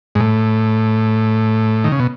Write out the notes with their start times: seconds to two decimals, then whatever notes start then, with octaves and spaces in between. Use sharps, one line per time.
0.15 G#2
0.20 A2
1.84 D#3
1.92 C#3
1.99 B2